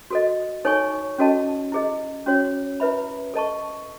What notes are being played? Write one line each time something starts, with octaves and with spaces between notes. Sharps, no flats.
F#4 A4 D#5
D#4 A4 C#5 G#5 C#6
C#4 F#4 A4 D#5 A5
E4 G#4 D#5
C#4 F#4 C#5
E4 B4 E5 B5
A4 D#5 A5 C#6